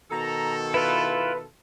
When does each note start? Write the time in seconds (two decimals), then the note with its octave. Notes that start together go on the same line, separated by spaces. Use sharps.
0.11 B2 D#3 A4 A#5
0.74 E4 F4 B4